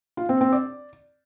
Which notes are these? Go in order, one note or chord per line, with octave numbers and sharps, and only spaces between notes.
F4
C4
C4
D5